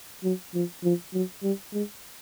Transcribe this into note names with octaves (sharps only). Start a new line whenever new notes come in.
F#3
F3
F3
F#3
G3
G#3